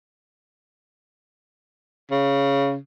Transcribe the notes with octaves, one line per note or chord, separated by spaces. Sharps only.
C#3